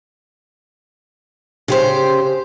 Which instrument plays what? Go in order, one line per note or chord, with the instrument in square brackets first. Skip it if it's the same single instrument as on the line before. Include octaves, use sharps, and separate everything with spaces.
[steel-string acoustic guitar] C#3 G4 C5